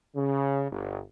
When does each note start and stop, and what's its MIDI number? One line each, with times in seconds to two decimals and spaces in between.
0.16 0.66 49
0.71 0.99 31